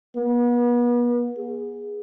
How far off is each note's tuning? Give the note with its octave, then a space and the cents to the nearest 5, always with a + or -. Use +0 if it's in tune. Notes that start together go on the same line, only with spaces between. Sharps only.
B3 -35
G#4 -10